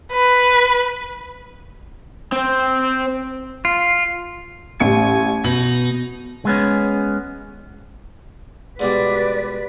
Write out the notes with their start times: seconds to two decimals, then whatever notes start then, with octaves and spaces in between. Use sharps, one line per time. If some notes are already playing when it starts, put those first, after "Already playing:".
0.12 B4
2.32 C4 C5
3.65 F4
4.80 A1 G4 G#5 C#7
5.45 B2 D#4 F#7
6.45 G#3 B3 C#4
8.79 G#2 B2 G3 B4 D5